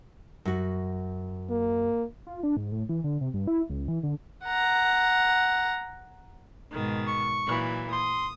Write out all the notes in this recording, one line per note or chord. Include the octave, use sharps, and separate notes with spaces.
F#2 F#4
A#3
F4
D4
G#2
A2
E3
D3
C3
G2
E4
C#2
E3
D3
F#5 A#5
G#2 B2 D#3
C#6
A#2 E3 F#3
C6 D#6